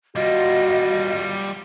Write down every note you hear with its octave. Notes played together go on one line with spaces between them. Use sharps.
G3 F4 F#4 D#5